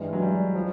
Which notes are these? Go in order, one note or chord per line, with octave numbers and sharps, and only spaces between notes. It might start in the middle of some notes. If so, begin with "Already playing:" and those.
Already playing: G2 E3 G#3
F#3
G3
F3